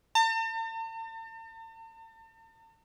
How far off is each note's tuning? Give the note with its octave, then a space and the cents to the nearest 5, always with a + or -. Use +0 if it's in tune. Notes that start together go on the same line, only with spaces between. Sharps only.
A5 +45